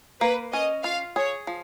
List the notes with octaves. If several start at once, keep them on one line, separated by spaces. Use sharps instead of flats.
A#3 B4
C#4 D#5
F4 F5
G#4 C#5
F3